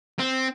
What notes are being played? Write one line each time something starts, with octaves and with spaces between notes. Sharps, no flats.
C4